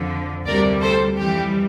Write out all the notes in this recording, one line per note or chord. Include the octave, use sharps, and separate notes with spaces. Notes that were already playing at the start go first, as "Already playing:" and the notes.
Already playing: F2 D3 F3
D2 C3 G3 A#4 D5
A4 C5
F2 E3 G3 G4